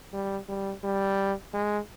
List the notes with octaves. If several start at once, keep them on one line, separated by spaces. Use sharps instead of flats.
G3
G3
G3
G#3